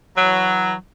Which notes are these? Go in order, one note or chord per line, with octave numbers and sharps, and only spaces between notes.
E3 F#3